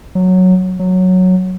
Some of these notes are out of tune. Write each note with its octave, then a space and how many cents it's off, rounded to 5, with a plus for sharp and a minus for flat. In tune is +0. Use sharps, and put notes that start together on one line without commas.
F#3 -5
F#3 -5